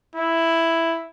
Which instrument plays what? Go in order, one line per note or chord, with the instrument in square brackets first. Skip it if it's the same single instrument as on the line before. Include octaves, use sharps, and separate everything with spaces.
[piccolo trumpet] E4